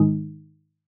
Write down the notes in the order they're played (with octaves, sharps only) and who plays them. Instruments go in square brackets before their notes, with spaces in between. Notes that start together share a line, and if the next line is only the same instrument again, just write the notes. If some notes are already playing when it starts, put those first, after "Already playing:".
Already playing: [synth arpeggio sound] G#2 D#3 G#3 D#4